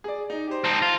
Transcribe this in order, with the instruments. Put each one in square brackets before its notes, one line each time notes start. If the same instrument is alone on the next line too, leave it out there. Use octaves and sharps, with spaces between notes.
[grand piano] G#4 D5
D#4
G4 C5
[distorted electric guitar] C4 D#4 [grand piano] A5
[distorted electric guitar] F4